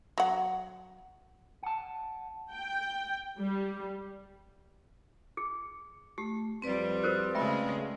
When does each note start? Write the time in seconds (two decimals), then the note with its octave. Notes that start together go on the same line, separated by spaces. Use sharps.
0.18 F#3 F#5
1.63 F#5 A5
2.50 G5
3.37 G3
5.37 G#4
6.18 A3 G4
6.62 F2 G3 C4 B4 D5
7.04 F#4 A#4 C5
7.34 C#3 G#3 A3 E5 G5 B5